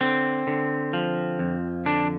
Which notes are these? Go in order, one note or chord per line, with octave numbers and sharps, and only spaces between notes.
D3 C4
D3
F3
F2
D3 D4